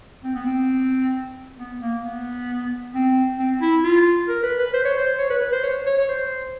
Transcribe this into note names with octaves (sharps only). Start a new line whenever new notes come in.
C4
B3
C4
B3
A#3
B3
C4
C4
E4
F4
A#4
B4
B4
C5
C#5
C5
C#5
B4
B4
C5
C#5
C#5
C#5
C5